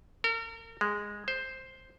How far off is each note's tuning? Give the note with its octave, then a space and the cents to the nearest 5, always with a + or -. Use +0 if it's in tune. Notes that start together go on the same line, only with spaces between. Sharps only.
A#4 -40
G#3 -10
C5 +5